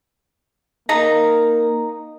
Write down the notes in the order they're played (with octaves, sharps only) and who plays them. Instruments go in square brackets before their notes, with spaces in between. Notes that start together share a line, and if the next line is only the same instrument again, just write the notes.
[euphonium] A#3 [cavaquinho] D#4 A#5